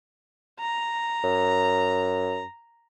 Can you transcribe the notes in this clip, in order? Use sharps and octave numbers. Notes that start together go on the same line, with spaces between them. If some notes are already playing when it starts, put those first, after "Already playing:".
A#5
F#2